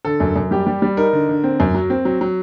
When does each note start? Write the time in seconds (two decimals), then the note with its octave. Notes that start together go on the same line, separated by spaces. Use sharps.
0.05 D3 A4
0.20 F#2
0.36 F#2
0.51 G3 G4
0.67 G3
0.82 G3
0.97 D#4 A#4
1.13 D3
1.29 D3
1.44 C4
1.60 F#2
1.74 F#3
1.90 C4
2.05 F#3
2.21 F#3